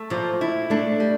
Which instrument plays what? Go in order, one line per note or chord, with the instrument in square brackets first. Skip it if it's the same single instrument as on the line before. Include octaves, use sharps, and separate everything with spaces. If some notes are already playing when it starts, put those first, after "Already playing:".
Already playing: [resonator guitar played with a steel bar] A3
[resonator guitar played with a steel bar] A#2 [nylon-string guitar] F3
[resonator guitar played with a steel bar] E4
[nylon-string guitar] A3 [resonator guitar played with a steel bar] D4
[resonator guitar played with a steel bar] G3